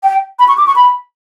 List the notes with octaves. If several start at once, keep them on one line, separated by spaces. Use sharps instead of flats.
G5
B5
C#6
D6
C#6
B5